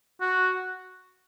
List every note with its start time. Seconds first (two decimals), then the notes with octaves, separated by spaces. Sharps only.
0.21 F#4